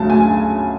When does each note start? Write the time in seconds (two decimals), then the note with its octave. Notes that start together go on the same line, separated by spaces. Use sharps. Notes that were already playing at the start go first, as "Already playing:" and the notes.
Already playing: D2 C#3 F#3 A3 A5
0.10 G#5